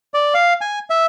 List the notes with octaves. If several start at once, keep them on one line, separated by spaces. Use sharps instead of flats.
D5
F5
G#5
E5